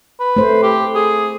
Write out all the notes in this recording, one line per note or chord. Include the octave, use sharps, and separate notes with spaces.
B4
A3 C5
G4
G#4